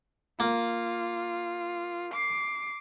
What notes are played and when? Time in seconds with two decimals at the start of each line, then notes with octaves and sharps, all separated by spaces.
0.40 A#3 F4
2.14 D6 C7